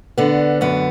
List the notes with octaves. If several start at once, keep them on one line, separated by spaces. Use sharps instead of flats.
D3 B3
F#2 B3